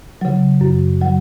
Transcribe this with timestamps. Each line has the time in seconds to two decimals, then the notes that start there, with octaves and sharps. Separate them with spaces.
0.21 C#3 F#3
0.61 F#2
1.02 C#3 F#3